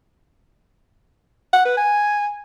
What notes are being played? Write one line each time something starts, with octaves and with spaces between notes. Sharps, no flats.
F#5
B4
G#5